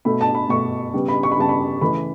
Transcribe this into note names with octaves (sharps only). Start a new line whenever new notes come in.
B2 A3 B5
A5
B5
B2 A3 C#6
C#3 G3 B3
B5
C#6
B5
C#3 G3 B3 A5
B5
C#3 E3 A3 B5